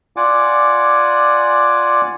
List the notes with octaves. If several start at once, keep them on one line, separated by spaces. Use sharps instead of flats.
F4 D5 F#5 G#5 D6